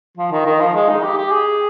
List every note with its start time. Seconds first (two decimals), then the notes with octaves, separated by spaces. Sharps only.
0.17 F3
0.32 D#3
0.46 D#3
0.60 F3
0.75 G#3
0.89 D#4
1.03 G4
1.17 G4
1.32 G#4